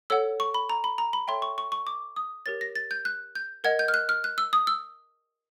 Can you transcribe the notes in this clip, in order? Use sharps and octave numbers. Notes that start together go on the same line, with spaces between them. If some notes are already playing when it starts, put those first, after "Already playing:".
A4 C#5 F#5 E6
C#6
B5
A#5
B5
A#5
B5
A4 C#5 E5 G5 C6
C#6
C#6
C#6
D6
D#6
G4 A#4 C#5 A6
A#6
A6
G6
F#6
G6
A#4 D#5 F#5 G#6
G6
F6
F#6
F6
F#6
E6
D#6
E6